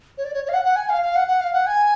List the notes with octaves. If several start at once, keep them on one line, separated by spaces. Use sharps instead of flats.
C#5
D5
C#5
C#5
F5
F#5
F#5
G#5
F5
F5
F#5
F#5
F5
F#5
G#5